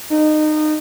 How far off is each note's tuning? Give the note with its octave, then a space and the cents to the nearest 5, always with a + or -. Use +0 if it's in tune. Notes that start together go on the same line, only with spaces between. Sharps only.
D#4 -25